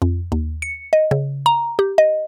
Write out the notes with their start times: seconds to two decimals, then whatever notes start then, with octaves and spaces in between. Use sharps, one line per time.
0.02 F2
0.32 D#2
0.62 C#7
0.93 D#5
1.11 C#3
1.46 A#5
1.79 G4
1.98 D#5